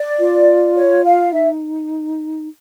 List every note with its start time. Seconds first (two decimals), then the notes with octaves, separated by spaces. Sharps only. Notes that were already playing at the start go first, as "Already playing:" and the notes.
Already playing: D5
0.19 F4
0.76 C#5
1.04 F5
1.32 D#4 E5